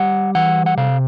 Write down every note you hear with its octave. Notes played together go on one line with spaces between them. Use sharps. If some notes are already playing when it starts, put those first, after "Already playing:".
Already playing: G3 F#5
E3 F#5
F#5
C3 F5